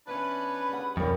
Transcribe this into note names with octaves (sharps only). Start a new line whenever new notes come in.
E2 C#4 D4 B4 E5 B5
G3 G#4 F#5
F2 B2 G3 C#4 A#4